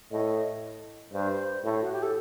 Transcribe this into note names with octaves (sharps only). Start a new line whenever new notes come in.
A2 D#5
G2 C5
A2
F#4
G4
A4